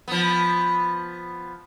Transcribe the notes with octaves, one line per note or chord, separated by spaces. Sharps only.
F3 B3